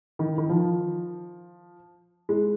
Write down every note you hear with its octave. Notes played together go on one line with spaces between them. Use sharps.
D#3
D#3
F3
G#3